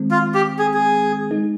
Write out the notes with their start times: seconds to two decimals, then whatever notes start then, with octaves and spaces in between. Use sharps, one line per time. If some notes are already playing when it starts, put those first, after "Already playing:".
Already playing: D#3 G#3 C4
0.11 F4
0.34 G4
0.59 G#4
0.74 G#4
1.31 G#3 D#4 G#4